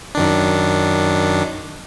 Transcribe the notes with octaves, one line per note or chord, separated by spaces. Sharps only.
F#2 D#3 D4